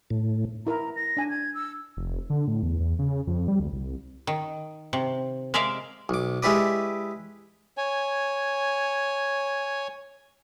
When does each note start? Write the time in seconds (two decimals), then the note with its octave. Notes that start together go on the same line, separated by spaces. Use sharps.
0.10 A2
0.67 E4 A#4 E5 A#5
0.96 A#6
1.17 D4 G#5
1.30 G#6
1.54 E6
1.97 F1
2.30 D3
2.48 A2
2.63 E2
2.80 E2
2.99 C#3
3.27 F2
3.48 G3
3.60 D2
3.73 C2
4.27 D#3
4.93 C3
5.54 G#3 A#4 D5 E5 F5
6.09 B1 D6
6.43 G#3 E4 G4 B4 D5
7.77 C#5 G#5